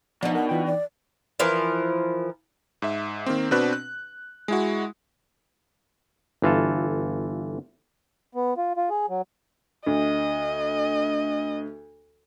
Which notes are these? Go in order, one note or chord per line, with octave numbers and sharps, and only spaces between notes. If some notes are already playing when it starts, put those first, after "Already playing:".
B2 F3 D4 D#4 F#5
A#4 F#5
E3 F4 G5
D5
E3 F3 A#4
G#2 E5
D#3 A#3 C4
B2 C4 D4 F#4 B4 F#6
F#6
G#3 E4 F#4
G1 E3 F4 A4
B3
F4
F4
G#4
F#3
D2 D#5